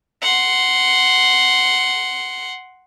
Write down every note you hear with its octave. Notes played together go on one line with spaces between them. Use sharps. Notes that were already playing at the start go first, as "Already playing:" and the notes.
F#5 C6